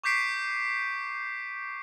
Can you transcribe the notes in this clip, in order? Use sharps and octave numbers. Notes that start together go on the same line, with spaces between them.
C#6 D6 G6 B6 C7 D7